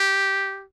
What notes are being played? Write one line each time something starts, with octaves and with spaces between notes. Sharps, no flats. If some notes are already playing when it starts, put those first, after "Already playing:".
Already playing: G4